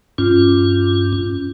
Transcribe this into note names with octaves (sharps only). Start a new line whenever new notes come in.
G2 C#4 F4